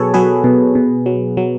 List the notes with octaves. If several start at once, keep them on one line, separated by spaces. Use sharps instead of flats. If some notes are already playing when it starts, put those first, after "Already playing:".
Already playing: B2 F#3 G#4 A4 B4 C#5
F#3 G#4 B4
B2
B2
F#3
F#3